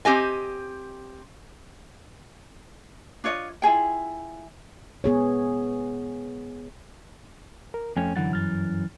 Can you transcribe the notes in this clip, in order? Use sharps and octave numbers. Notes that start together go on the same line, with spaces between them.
C4 G4 D#5 G#5
D4 F4 C#5 D#5
E4 F4 G#4 G5
B3 G#4 C#5
A#4
F2 A3 C#4 G5 G#5
F#2 D3 E3 F#5 A6
G2 F6 A6